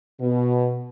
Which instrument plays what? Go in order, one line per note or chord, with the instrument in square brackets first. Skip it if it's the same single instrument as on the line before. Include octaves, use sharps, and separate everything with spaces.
[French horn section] B2